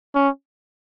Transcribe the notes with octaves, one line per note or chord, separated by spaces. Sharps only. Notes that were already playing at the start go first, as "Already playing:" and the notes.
C#4